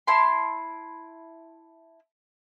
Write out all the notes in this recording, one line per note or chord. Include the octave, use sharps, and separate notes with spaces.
E4 A5 B5 C6